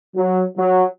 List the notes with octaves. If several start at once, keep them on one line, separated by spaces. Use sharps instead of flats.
F#3
F#3